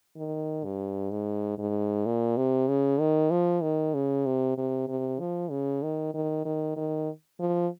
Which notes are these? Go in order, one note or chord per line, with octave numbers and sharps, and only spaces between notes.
D#3
G2
G#2
G#2
A#2
C3
C#3
D#3
F3
D#3
C#3
C3
C3
C3
F3
C#3
D#3
D#3
D#3
D#3
F3